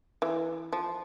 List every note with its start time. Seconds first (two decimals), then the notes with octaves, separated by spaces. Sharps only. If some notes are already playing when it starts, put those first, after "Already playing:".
0.22 E3
0.73 F3